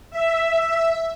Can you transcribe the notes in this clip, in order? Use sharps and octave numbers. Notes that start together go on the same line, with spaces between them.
E5